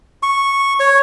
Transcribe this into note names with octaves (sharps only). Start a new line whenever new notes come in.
C#6
C#5